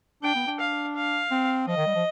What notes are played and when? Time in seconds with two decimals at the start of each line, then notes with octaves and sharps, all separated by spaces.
0.23 D4 G5
0.35 B3
0.47 D4
0.60 F5
0.96 F5
1.31 C4
1.67 F3 D#5
1.77 D#3
1.86 G3
1.95 F3